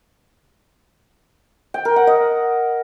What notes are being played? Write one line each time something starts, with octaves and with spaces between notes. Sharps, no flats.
G5
A#4
F#5
D#5